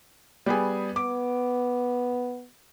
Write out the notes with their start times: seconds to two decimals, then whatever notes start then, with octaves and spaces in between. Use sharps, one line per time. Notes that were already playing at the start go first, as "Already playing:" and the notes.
0.46 G3 B3 G#4
0.96 B3 D6